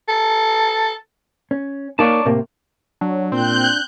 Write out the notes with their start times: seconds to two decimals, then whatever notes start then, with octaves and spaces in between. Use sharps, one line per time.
0.08 A4
1.51 C#4
1.99 A#3 D#4 C#5 D5 A5
2.25 A2 C3 A#3
3.01 F#3 D4
3.32 A#2 C4 F#6 G6